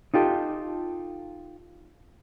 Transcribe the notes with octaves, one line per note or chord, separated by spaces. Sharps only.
D#4 F4 G4 A4